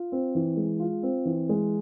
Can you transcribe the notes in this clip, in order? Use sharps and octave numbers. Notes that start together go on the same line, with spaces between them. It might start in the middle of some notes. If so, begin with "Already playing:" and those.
Already playing: F4
C4
E3
G#3
F4
C4
E3
G#3